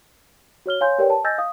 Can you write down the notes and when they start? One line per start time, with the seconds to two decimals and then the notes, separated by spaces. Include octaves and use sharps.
0.66 F#4 C#5 F6 G7
0.81 C#5 F5 G#5 C6 G6
0.99 G4 A#4 B4 C#5 D5 G5
1.10 A5
1.24 D#5 G#5 E6 G6 A6 A#6
1.38 F5 D#6